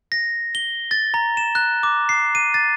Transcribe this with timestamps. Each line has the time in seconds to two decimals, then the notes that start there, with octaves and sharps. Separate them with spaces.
0.12 A#6
0.55 G7
0.91 A6
1.14 A#5
1.37 E7
1.55 F#6
1.83 D6
2.09 C7
2.35 D#7
2.54 A6